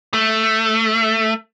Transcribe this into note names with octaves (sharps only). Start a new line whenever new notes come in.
A3